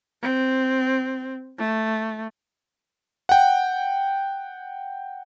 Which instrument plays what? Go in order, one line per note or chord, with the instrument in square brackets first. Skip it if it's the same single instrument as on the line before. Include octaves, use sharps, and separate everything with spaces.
[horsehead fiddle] C4
A3
[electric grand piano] F#5 G5